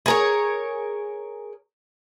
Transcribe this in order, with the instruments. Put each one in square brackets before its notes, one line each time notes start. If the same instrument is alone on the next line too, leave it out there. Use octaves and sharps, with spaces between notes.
[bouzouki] G#4 A#4 C#5